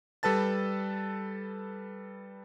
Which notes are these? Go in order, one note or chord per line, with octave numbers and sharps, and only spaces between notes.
G3 A4 B4 A5 A6